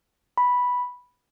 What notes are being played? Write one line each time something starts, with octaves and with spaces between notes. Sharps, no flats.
B5